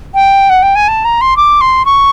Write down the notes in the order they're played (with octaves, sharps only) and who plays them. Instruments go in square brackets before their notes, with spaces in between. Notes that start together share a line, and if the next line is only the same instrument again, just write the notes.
[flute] G5
F#5
G5
G#5
A5
A#5
C6
D6
C6
C#6